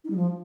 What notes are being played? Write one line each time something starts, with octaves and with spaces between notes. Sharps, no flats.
D#4
G3
F3